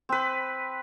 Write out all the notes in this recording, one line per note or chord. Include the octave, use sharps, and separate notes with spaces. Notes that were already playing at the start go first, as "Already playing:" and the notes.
C4 B4